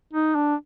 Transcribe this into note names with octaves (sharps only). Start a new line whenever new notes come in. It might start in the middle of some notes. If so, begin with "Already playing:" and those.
D#4
D4